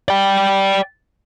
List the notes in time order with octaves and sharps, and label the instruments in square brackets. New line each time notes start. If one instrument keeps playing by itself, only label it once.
[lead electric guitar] D5 G5